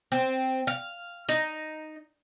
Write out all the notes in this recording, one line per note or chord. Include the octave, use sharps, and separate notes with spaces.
C4
F5
D#4